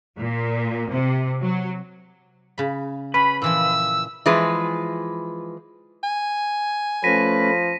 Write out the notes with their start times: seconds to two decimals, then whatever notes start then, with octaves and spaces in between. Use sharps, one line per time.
0.18 A#2
0.89 C3
1.41 F#3
2.58 C#3 B5
3.14 C#4 B4 B5
3.42 A#2 E3 F3 E6
4.26 E3 F3 G#3 B4
6.03 G#5
7.04 F3 A3 C#4 B4 A#6 B6 D#7